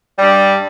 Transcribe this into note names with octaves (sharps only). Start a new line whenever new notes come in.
G2 G3